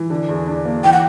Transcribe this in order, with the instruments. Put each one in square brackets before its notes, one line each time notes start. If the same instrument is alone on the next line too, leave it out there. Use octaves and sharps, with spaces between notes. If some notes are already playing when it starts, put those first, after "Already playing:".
Already playing: [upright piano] E3
D3
E2
D4
A#3
[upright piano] E3 [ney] G5
[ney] F#5